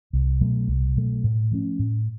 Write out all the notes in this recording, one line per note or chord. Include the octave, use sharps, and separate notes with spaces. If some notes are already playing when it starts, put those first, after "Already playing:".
C2
B2 F#3 A3
C2
B2 F#3 A3
A2
F3 A3 C#4
A2